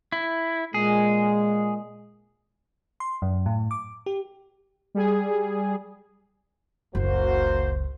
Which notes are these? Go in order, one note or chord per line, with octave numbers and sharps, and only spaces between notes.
E4
A#2 G#3 G#4
C6
F#2
A2
D6
G4
G3 G#4
F#1 C#2 A#3 F#4 C5